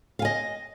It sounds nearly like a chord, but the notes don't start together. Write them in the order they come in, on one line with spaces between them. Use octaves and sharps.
F5 G#5 D#5